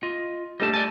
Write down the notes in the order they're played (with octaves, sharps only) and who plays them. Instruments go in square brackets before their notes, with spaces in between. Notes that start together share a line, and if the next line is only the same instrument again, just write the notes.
[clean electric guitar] F4 D#5
[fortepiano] G3 A3 [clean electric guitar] D#5 A5
[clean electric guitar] D5 G#5 A5